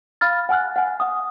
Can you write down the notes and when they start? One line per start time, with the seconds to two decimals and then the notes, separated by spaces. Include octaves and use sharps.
0.21 F5 B5 F6 A6
0.49 F#5 G#5 F6 F#6
0.76 F#5 G#5
1.00 F#5 D#6